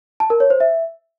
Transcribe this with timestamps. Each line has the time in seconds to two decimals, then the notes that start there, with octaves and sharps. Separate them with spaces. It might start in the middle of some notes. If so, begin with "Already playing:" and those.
0.20 A5
0.30 A#4
0.40 C#5
0.50 C5
0.60 E5